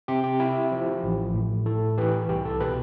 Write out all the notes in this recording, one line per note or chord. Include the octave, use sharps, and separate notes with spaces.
C3 G4
G4
E4
F3
A1
A2
A2 A4
E3 G4 B4
C2 G4
A4
B2 G4 B4